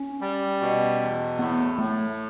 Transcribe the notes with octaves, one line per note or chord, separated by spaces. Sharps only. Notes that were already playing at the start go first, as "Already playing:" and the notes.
Already playing: C#4
G3
B2
E2
A2 B3
A2 A3